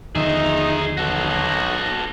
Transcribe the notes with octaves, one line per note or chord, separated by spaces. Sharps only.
D#2 D3 F3 D#4 G#4 E5
B1 F#4 A4